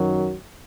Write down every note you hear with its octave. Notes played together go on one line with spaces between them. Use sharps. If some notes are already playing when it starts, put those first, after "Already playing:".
Already playing: F#2 D#3 F#3